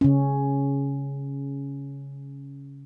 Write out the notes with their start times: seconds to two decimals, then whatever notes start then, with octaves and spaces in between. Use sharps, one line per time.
0.01 C#3 C#4